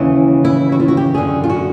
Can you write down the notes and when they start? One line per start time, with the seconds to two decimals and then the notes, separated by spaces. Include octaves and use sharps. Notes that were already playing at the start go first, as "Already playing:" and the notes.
Already playing: D#2 C#3 E3
0.45 E4
0.72 F#4
0.80 F4
0.88 F#4
0.97 G4
1.14 F#2 D3 G#4
1.44 F4
1.50 F#4